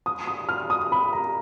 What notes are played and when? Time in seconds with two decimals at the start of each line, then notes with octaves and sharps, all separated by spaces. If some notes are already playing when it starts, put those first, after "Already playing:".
0.06 D#6
0.27 D#6
0.49 F6
0.70 D#6
0.92 B5
1.13 A#5